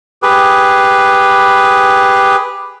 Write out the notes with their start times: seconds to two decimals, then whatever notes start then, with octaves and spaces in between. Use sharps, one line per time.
0.23 G4 G#4 B4